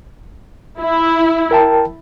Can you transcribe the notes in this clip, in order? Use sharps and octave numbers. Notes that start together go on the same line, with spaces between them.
E4
A#4 G5 A5